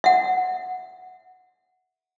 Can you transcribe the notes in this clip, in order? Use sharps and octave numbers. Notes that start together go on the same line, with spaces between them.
E5 F#5